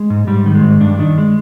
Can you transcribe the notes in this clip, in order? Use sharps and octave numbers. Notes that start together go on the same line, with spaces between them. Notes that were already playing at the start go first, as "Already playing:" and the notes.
Already playing: G#3
G#2
G#2 G3
D#3
G#3
G#2
G2 D4
D#3 D4
G#3